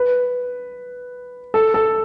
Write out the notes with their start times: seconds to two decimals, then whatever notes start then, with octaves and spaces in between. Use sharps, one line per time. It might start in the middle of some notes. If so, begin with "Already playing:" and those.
Already playing: B4
1.54 A4
1.74 A4